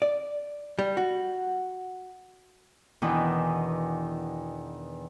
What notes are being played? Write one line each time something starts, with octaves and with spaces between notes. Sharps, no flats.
D5
G3
F#4
E2 B2 D#3 E3 D4